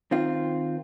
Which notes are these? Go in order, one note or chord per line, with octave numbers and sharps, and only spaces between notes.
D#3 C4 F4